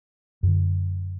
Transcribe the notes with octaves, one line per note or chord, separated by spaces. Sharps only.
F#2 D3